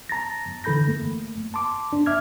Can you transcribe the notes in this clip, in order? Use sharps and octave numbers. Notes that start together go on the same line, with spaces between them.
A5 A#5 A6 A#6
D3 E3 A4 B5 G6 A#6
A3 A#3
A5 C6 D6
D4
E5 D6 F6 G#6